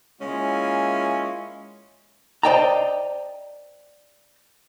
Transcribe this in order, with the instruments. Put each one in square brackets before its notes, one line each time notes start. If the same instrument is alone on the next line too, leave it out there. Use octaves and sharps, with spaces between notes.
[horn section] G#3 A#3 C#4 E4 F4
[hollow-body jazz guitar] C5 D5 D#5 G5 A5 A#5